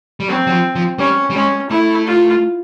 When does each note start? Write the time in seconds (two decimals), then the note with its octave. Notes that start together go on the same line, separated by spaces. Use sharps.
0.20 G3
0.28 F#3 C4
0.47 F#3
0.51 F3
0.75 F3
0.99 G3 C#4
1.30 G3
1.35 G#3 C#4
1.70 A3 E4
2.07 F4